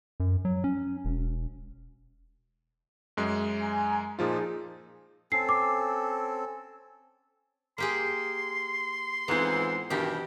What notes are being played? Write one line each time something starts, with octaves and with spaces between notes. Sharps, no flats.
F#2
F#3
C#4
E1
F#2 G#3
G#5 A#5
A#2 F3 D#4 F4 G#4
C4 C#4 A4 C7
D6
A#3 G4 G#4 C6
F2 G#2 E3 B3 C4
G2 B2 D#3 E3 G4